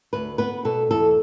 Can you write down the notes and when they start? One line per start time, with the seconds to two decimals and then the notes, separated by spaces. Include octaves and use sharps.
0.13 D2 B4
0.38 B3 B4
0.65 B2 A4
0.91 E2 A4